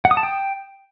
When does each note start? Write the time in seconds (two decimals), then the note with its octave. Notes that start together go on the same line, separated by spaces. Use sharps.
0.05 F#5
0.11 D#6
0.17 A5
0.23 G5